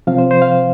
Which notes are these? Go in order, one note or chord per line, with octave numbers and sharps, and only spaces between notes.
C3 F3 C4 F5
C5
C5
F5